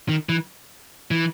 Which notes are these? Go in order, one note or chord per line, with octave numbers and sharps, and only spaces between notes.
D#3
E3
E3